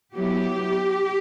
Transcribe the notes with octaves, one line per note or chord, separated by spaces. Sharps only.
F#3 B3 E4 G4